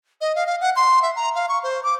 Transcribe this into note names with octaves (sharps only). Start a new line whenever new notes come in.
D#5
F5
F5
F#5
C6
E5
A#5
F5
C#6
C5
D6